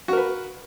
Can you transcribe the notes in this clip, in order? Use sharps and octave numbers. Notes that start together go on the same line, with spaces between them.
F#4 A#4 B4